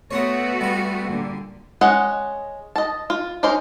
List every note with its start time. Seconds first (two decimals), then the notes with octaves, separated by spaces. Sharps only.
0.11 A3 B3 F#4 C#5 C6 D#6
0.61 G3 F4
1.08 A#2 D3
1.81 G#3 C#4 D#5 F#5
2.76 D#5 A5
3.10 F4
3.43 C#4 D#4 A#4 C5